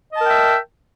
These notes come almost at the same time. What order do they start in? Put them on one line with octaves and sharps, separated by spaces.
D#5 A5 A#4 G5 E5